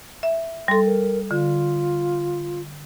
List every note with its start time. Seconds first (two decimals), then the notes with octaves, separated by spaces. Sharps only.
0.23 E5
0.68 G3 A4 C6
0.86 A#4
1.31 D3 F4